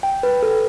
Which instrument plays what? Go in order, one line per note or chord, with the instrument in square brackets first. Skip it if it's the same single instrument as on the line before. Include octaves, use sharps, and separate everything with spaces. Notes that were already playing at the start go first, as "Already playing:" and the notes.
[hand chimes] G5
B4
A4